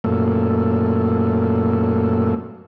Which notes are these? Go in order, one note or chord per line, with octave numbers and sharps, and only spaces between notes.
F#2 A#2 A3